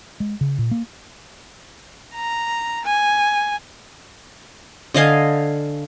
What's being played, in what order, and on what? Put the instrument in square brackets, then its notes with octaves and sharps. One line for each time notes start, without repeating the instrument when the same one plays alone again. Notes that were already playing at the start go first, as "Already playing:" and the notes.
[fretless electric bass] G#3
C#3
A#2
A#3
[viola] A#5
G#5
[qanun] D3 D#5 F5 G#5